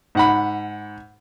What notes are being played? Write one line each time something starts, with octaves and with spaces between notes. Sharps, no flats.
G#2 F#5 B5